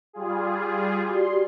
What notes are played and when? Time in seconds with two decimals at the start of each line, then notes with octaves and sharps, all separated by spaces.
0.13 G3 F4 G#4
1.09 F#4 G4 D5 C6